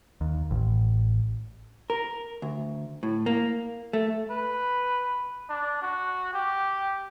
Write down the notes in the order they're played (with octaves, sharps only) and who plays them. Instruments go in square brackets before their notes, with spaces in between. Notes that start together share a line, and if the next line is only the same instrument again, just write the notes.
[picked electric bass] D#2
A1
[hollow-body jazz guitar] A#4
D2
A2
A#3
A3
[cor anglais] B4
[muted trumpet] D4
F#4
G4